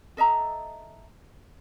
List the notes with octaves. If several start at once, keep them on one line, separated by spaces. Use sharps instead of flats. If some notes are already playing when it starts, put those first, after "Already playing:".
A4 D#5 E5 A#5